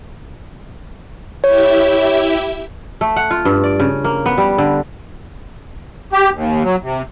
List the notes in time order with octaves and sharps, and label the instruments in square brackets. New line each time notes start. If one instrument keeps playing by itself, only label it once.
[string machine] E4 G4 E5 [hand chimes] C#5
[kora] A3
F#5
F4
G2
D5
C#3
A#3
B3
G3
D3
[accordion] G4
D#2
F#3
C3